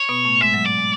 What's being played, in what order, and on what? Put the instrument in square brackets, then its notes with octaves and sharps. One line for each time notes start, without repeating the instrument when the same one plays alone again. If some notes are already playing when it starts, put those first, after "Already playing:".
Already playing: [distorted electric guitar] C#5
[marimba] B2 B3
A2 A3
[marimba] G#2 G#3 [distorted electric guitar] E5
[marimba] F#3
[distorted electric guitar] D5
[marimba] G#3